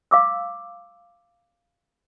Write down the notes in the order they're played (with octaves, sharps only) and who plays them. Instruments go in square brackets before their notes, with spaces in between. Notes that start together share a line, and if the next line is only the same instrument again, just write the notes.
[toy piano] F5 D6 E6